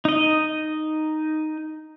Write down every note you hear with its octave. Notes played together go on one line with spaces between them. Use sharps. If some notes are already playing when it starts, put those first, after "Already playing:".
D#4 D#5